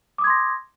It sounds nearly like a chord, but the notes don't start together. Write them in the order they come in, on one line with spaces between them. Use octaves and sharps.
D6 D#6 G#6 C6 A#6